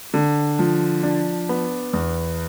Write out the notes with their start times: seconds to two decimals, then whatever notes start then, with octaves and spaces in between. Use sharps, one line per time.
0.14 D3
0.59 F3
1.03 D4
1.49 B3
1.93 E2